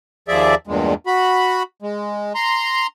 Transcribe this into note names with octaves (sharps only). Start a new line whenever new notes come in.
D#2 F3 G#4 D5 E5
E2 G2 A#2 G#3
F#4 B5
G#3
A#5 C6